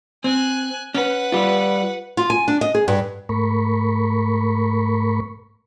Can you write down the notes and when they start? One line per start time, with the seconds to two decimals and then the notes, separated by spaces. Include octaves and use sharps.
0.24 C4 G#5 F#6
0.94 C#4 B4 F#5
1.32 G3 F4
2.17 F4
2.30 G#5
2.48 D4
2.61 D#5
2.75 G#4
2.88 G2
3.29 G#2 A3 A#4 B5 C#6